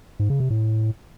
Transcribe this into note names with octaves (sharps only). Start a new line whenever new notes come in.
G#2
C#3
C3
A2